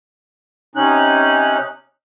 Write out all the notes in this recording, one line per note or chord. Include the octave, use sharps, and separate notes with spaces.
C3 C#4 D#4 F#6